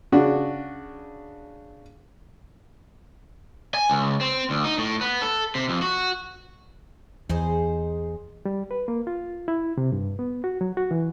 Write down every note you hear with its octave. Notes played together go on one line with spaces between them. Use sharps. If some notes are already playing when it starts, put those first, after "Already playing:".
C#3 D4 F#4
G#5
C#2
C4
D2
D#4
A2
B3
A4
C3
F2
F#4
E2 D#4 G#4 C5
G3
B4
A#3
F4
E4
C3
G2
B3
F#4
F#3
F#4
E3